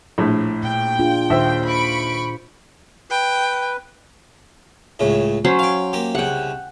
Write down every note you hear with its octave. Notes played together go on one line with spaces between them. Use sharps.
A#1 A2
A#2 G5
D4 F4 G#4
D#2 A#2 C5 E5
B5 C#6 D7
B4 G5
C#2 A2 C#3
F#3 C#4 C5
F5 G5
A#3 G4
C2 C#3 F#5 G5